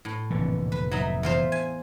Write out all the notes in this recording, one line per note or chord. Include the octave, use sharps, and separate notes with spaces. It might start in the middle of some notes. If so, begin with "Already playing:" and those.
A2
F1 A#2 D3 E3
B4
F#3 D#4 E5
E2 F4 C5
G#5